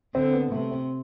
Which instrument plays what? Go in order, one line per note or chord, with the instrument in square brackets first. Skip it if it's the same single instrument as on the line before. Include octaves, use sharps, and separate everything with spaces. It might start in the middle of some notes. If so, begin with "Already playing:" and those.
[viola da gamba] D3 [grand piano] C4
[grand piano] B3
[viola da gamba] C3 [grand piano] A3
[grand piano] C4